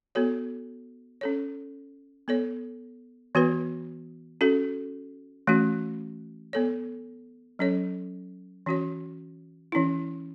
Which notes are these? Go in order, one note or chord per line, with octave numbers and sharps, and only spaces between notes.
B3 F#4 A4 C#5
C#4 A4 C#5
B3 A4 C#5
E3 B3 F#4 B4
C#4 F#4 A4
E3 A3 C#4 F#4
B3 A4 C#5
F#3 C#4 A4 C#5
E3 C#4 F#4 C#5
E3 C#4 E4